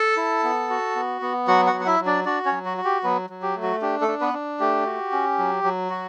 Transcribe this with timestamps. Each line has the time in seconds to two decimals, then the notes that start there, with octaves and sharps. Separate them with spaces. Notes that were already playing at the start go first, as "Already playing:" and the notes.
Already playing: A4 A5
0.17 E4
0.43 B3
0.70 F#4
0.96 B3
1.22 B3
1.48 F#3 F#4 F#5
1.67 F#4 F#5
1.73 F#3
1.81 F#5
1.86 E4 E5
2.00 F#3
2.06 D4 D5
2.25 D4 F#4 D5
2.45 C#4 C#5
2.52 F#3
2.65 F#4
2.77 F#4
2.85 G4
3.04 F#3 B3 B4
3.30 F#3
3.42 G4
3.56 A3
3.63 F#4
3.82 D4 G4
4.01 A3 A4
4.08 D4
4.21 B3 B4
4.33 D4
4.60 A3 G4
4.86 F#4
5.12 C#4
5.39 F#3
5.64 F#3
5.90 F#4